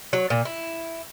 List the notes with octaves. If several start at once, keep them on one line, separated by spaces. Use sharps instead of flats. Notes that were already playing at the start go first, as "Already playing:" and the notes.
F#3
A#2
E4